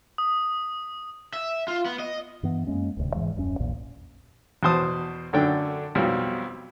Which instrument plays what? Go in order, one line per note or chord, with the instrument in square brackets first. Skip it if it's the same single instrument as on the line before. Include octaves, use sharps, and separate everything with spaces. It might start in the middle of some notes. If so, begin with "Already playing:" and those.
[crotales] D#6
[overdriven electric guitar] E5
F4
B3
D#5
[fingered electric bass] G2 E3 B3
F#2 G#3 A#3 C#4
D1 A1 D2 C3
G#2 B2 E3 G#3
D#1 F#2 C#4
A#1 E2 A#2
[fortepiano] E2 B2 C5 A5 D#6
F#2 D3 A3 D4 G5
B1 F2 B2 G3